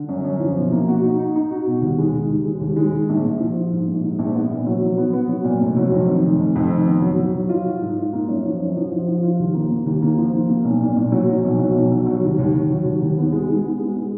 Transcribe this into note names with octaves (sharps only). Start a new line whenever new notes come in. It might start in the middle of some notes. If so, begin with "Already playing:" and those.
Already playing: D3
F#2
F#2
F3
B2
A#3
F#4
D#4
D#4
D#4
F#4
B2
D#2
G#3
D#3
D#2
G#3
D#2
G#3
D#3
A#1
A#1
F3
F3
G#2
A#1
G#2
A#1
B3
A#2
F#3
F#3
B3
B3
F#3
A#2
F1
F#3
F2
D#3
F1
F1
F2
D#3
B3
F#3
F#3
F#3
F4
F4
G#2
F4
A#3
F#2
F3
F#2
F3
F3
F3
F4
D#2
A#3
A#3
D#2
A#3
F3
A#3
A#3
B1
A#2
A#2
F#3
F#3
B1
F#3
B1
F#3
F#3
D#2
D#2
D#2
F#3
D#2
D#2
B3
G#3
G#3
B3
G#3
G#3